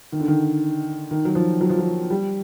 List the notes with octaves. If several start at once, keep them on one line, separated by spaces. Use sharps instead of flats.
D#3
D3
D#3
D#3
F#3
F3
F#3
F3
F#3
G3